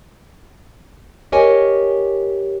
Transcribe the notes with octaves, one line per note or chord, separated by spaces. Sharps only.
G4 A#4 C#5 D#5 G#5